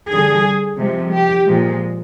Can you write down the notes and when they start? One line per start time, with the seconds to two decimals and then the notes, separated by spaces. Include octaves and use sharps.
0.10 D3 G3 G#4
0.77 C3 F3 G#3
1.12 G4
1.45 A#2 F3 G#3